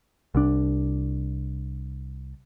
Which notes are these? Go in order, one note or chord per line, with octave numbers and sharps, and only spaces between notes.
C2 D4